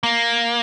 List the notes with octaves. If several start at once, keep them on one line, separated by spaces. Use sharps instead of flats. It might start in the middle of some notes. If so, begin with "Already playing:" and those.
A#3